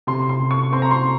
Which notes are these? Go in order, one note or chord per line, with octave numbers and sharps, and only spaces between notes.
C3 C6
C6
C3
C#6
C4 C6
A#5
C6